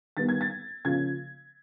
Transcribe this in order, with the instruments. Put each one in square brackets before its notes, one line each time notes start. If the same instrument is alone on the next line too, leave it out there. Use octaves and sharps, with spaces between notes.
[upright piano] D#3 G3 B3 A6
G#6
A6
C#3 F3 A#3 G#6